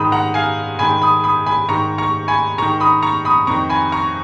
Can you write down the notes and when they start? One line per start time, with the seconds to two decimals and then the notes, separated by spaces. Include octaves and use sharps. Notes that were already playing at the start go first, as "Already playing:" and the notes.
Already playing: G#2 D#3 B5 D#6
0.12 F#5 A#5
0.34 F5 G#5
0.79 G#2 D#3 G#5 B5
1.02 B5 D#6
1.24 B5 D#6
1.46 G#5 B5
1.69 G#2 D#3 A#5 C#6
1.98 A#5 C#6
2.28 G#5 B5
2.58 G#2 D#3 A#5 C#6
2.80 B5 D#6
3.02 A#5 C#6
3.25 B5 D#6
3.47 F2 D#3 A#5 C#6
3.70 G#5 B5
3.92 A#5 C#6